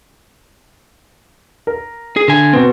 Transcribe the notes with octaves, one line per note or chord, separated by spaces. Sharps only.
A#4
G#4
D3 G#5
B2 B3 C4